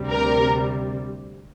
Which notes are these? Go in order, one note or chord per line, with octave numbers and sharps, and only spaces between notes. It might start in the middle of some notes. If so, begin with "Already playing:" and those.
Already playing: D2 C3 G3
A#4